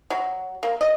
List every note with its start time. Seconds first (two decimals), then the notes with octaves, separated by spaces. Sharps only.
0.10 F#3
0.63 A#3
0.81 D#5